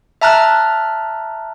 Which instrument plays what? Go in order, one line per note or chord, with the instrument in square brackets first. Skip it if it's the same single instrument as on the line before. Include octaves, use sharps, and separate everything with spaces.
[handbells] E5 A5 A#5 F6 F#6